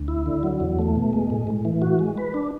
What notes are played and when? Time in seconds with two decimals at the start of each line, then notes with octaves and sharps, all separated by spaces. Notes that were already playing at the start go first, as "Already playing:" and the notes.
Already playing: D2
0.08 E4
0.26 D3
0.43 F#3
0.60 E2
0.79 A3
0.96 B2
1.13 G#3
1.30 A2
1.47 A2
1.65 E3
1.82 F#4
1.99 G#3
2.18 B4
2.34 D4